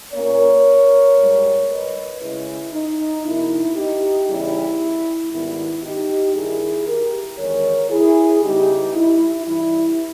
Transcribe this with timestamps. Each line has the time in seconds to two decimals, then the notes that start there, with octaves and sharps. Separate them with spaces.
0.13 A#2 A#3 C#4 A#4 C#5
1.17 G#2 G3 A#3
1.69 B4 D#5
2.21 C#3 G#3 C#4 E4
2.73 D#4
3.24 E2 B2 A#3 E4
3.76 D#4 G4
4.28 E2 C#3 G3 E4
5.32 G#2 D#3 G3 B3 E4
5.83 D#4 G4
6.35 G2 D#3 A#3 E4 G#4
6.87 G4 A#4
7.39 E2 D#3 G#3 A#4 C#5
7.91 E4 G#4
8.42 C#3 G3 B3 D#4 G4
8.94 E4
9.46 G2 E3 G3 E4